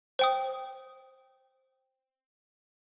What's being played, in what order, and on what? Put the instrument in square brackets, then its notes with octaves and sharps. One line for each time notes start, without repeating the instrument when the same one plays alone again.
[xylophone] C5 G5 D#6